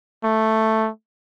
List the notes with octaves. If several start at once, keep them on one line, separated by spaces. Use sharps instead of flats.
A3